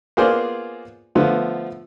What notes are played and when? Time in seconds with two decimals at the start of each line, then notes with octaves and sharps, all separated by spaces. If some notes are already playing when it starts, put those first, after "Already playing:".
0.17 A#3 B3 F4 G#4 C5 D5
1.15 D3 F3 A3 B3 F4